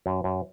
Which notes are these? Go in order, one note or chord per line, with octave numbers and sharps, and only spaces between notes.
F#2
F#2